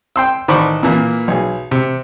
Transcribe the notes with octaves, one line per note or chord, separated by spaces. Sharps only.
G5 C6 E6
A1 D#3 C5 D5 B5 C#6
A#2 E3 A#3
B1 G#4
C3